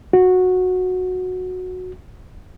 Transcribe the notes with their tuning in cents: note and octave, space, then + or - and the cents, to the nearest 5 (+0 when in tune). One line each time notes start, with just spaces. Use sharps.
F#4 -10